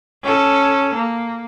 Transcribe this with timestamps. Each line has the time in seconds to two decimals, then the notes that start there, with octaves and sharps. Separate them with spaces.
0.23 C#4 A4
0.95 A#3